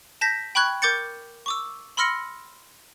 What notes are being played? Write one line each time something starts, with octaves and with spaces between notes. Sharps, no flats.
A5 G6 A#6 B6
G5 B5 C#6 F#6 G#6
A#4 D6 G6 A6 C#7
C#6 D6 E6
B5 C6 E6 F6 A#6 C#7